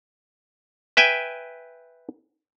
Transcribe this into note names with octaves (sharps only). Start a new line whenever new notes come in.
B4 E5 G5 G#5